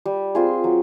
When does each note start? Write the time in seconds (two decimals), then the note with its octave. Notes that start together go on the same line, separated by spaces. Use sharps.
0.06 G3
0.35 C4 F4 G#4
0.64 F#3